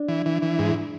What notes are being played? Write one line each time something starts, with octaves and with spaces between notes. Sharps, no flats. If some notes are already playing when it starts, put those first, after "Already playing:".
Already playing: D4
E3
E3
E3
G#2